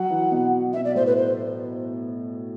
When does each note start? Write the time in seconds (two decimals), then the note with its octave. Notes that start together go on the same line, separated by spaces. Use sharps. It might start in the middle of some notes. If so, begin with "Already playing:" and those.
Already playing: F#3 F#5
0.10 E3
0.32 B2
0.73 B2 E5
0.85 D5
0.95 A2 C5
1.06 B4
1.17 C5